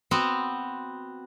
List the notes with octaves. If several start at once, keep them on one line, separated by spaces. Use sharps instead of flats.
B3 C4 F#4